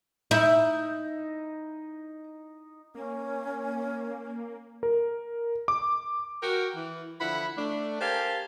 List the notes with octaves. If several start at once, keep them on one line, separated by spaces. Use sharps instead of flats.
D#4 E4
A#3 C#4
A#4
D6
F#4 A#4 G5
E3
D3 F3 E4 F#5 B5
A3 D4
G4 A#4 C5 F5 G#5 A5